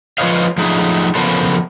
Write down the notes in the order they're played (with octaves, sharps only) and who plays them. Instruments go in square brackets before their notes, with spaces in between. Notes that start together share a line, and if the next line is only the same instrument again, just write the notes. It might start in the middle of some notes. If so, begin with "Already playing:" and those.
[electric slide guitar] F3 F4 B4 C#5 D#5 F5
F3 F#3 A3 D#4 G#4
C#3 F3 B3 A4 A#4 C5